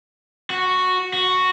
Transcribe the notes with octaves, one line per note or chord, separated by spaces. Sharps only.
F#4
F#4